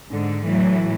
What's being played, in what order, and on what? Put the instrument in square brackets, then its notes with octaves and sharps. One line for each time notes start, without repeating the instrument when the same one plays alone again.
[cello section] G#2 D3
A2 E3 F#3